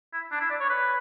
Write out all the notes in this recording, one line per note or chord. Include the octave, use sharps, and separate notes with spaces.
E4
D4
E4
D5
C#5
B4